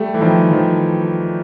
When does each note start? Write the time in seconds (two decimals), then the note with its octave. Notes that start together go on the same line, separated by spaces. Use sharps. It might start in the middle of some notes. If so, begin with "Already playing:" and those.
Already playing: G3 A3
0.14 E3
0.21 D#3 F3
0.51 D#3 F3